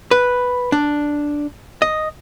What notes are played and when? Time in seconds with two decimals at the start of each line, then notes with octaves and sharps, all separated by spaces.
0.11 B4
0.72 D4
1.82 D#5